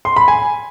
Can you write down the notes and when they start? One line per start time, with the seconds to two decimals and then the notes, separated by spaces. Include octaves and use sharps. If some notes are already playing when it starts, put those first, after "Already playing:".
0.05 C6
0.16 B5
0.28 G#5